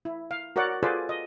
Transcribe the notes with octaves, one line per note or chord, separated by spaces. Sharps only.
E4
F5
F#4 A#4 C#5 D5 F#5
F4 G#4 A4 B4 C5 D5
D#5